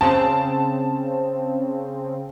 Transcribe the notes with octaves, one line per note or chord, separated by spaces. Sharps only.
C#3 C4 A5